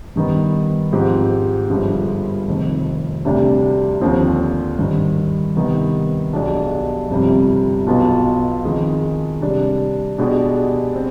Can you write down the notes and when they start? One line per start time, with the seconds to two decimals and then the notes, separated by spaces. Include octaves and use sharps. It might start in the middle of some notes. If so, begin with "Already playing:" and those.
0.16 G2 D#3 B3
0.93 G#2 F3 C4 G4
1.69 G1 G2 F3 G#3
2.47 F1 F2 D#3
3.25 D2 C3 G3 D4 G4
4.01 D#2 D3 F3 C4
4.78 G#1 G2 D#3
5.56 C2 C3 D#3 B3
6.33 B1 B2 G#3 D4 G4
7.10 G1 F2 C3 G3
7.87 B1 B2 B3 F4
8.64 F2 D#3 G#3
9.41 C3 G3 D4
10.18 B2 G#3 D4 G4
10.95 C4